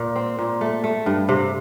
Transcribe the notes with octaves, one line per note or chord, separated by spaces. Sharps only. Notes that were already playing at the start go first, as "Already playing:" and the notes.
Already playing: A#2
C4
A#2
A3
A3
G2
C3